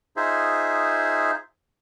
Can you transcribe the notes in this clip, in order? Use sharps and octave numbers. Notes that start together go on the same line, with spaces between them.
D#4 F4 G#4 C5 E5